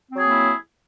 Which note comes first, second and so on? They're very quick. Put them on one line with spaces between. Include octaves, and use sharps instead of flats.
C4 F#3 G#4 A#3 E4